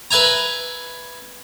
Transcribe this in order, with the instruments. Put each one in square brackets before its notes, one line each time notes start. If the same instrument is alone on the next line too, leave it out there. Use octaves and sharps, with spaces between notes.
[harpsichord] B4 E5 G#5 A#5